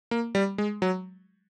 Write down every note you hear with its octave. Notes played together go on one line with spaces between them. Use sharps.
A#3
G3
G#3
F#3